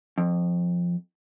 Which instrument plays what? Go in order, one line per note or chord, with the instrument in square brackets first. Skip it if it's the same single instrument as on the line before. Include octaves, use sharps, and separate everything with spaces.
[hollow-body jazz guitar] F2